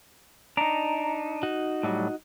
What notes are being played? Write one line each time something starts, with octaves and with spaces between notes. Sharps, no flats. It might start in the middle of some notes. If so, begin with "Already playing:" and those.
D4 D#4 A#5
D#4 F#4
A2 F#3 G3